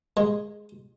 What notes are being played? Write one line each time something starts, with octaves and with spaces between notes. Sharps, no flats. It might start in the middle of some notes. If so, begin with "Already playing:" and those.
G#3